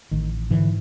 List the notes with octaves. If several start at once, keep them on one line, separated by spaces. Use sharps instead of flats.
A1 D#3
G#2 D3 E3